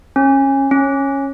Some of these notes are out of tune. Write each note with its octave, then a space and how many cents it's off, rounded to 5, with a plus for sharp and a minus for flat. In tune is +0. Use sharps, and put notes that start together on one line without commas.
C#4 -25
C#4 -10